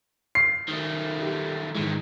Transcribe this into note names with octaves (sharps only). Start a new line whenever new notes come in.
C7
D#3 A3
D#4 G4
G#2 D#3 E3 G#3